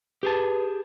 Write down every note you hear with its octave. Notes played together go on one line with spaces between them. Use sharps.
G4 G#4 B4 A5